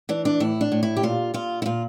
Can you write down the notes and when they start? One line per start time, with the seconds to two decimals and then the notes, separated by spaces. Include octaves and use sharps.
0.09 E3 D4
0.25 D4
0.40 A2 E4
0.61 D4
0.72 A2
0.83 E4
0.97 G4
1.03 A#2 F4
1.34 A#2 F4
1.62 E4
1.66 A#2 F4